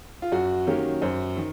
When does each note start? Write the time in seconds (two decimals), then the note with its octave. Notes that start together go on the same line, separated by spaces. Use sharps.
0.22 F4
0.32 F#2 F#4
0.67 D#3 F#3 A#3 C#4 G4
1.02 F#2 C5
1.37 D#3